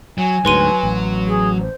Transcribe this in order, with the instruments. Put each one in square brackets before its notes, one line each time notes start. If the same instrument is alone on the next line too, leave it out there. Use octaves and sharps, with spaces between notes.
[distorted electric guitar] F#3 [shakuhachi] G#5
[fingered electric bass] D2 G#2 [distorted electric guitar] F#3 [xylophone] B4 C6 D#7
[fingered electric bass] A1
[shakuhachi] G#4
C5